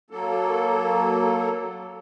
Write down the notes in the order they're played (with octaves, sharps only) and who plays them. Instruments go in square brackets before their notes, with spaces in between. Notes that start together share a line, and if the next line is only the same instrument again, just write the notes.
[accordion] F#3 A#3 A4